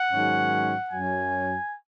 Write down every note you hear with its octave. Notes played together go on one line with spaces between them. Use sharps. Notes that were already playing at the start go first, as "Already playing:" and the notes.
Already playing: F#5
G#2 D#3 F#3 C#4
F#2 F#3 C#4 G#5